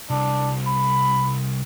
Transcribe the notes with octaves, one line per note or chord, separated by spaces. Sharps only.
C2 D4
B5